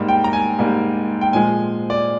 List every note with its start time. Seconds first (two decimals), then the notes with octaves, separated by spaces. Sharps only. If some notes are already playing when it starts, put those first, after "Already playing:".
Already playing: G#2 G3 A#3
0.08 G5
0.24 A#5
0.33 G#5
0.59 G#2 G3 A#3
1.21 G5
1.33 A#2 F3 G#3 G#5
1.90 D5